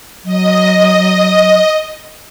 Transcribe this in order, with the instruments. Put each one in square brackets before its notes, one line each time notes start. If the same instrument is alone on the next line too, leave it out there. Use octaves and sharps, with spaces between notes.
[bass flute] F#3 [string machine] D#5